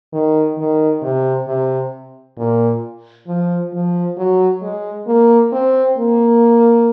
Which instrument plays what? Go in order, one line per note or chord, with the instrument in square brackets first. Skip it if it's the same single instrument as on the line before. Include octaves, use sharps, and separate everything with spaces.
[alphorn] D#3
D#3
C3
C3
A#2
F3
F3
F#3
G#3
A#3
C4
A#3